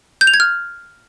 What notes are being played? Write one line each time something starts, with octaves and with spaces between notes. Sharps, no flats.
G6
F7
G#6
F6